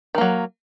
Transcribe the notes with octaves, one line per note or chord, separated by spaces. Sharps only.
D#3 F#3 A#3